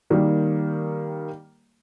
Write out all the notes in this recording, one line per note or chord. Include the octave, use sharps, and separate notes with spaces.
D#3 G3 A#3